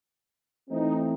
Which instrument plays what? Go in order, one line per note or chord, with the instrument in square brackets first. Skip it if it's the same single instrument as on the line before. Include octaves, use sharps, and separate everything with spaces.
[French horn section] E3 A3 C4 [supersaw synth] D#4